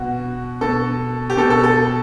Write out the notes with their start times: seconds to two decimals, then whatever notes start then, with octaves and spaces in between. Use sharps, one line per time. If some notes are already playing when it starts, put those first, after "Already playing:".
Already playing: B2 F#4
0.61 B2 A4
1.30 G4
1.37 B2 A4
1.50 A4
1.64 A4